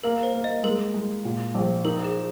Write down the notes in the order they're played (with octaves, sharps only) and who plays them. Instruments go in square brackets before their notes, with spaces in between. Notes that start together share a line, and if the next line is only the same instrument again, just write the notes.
[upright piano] A#3 [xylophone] A#4
[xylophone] C5
[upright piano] A#3
[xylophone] D#5
[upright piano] G#3 [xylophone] A#4
[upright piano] G#3
A#2
A#1
[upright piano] D#4 [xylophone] A#4
[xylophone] G#4